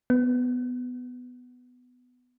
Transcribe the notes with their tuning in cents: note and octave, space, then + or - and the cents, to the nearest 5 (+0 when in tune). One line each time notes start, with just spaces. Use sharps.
B3 +10